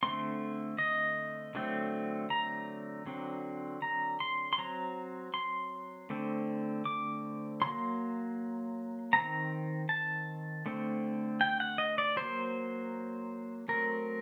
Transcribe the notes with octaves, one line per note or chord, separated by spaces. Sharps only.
D3 A3 C4 C6
D#5
D3 F#3 A3 C4
A#5
D3 F#3 C4
A#5
C6
C6
F#3 C4 A#5
C6
D3 A3 C4
D6
F#3 A#3 C6
D#3 A3 C4 A#5
A5
D3 A3 C4
G5
F#5
D#5
D5
F#3 A#3 C5
F#3 A3 C4 A#4